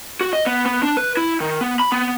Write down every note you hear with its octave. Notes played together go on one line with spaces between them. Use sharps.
F#4
D#5
B3
B3
D4
B4
E4
D#3
B3
B5
B3